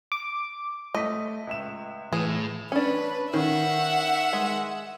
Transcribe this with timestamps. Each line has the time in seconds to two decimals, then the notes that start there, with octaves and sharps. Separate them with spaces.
0.12 D6
0.95 A3 D#5 B6
1.47 C#2 E5 E7
2.13 A2 E3 G#4
2.72 C#4 D4 B4
3.33 D#3 C#4 E5 F#5
4.33 G#3